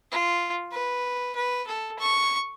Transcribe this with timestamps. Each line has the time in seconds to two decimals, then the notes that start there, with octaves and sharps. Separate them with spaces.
0.12 F4
0.71 B4
1.35 B4
1.67 A4
1.99 C#6